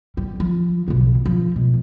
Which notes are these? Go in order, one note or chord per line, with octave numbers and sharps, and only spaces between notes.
G3
F3
B1 C#3
F3
B2